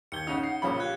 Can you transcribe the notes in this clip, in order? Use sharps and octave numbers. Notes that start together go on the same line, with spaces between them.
D#2 G6 G#6 C#7 G7
C#3 D#4 F5 F#5 F#6 F7
C7
A#1 C#3 F3 C#4 F5 B5 C#7
F4 G4 F#6 G#6